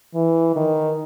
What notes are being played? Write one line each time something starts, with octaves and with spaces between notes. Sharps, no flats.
E3
D#3